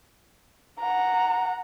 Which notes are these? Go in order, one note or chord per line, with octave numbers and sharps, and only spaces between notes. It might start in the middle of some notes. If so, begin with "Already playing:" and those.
F#5 A#5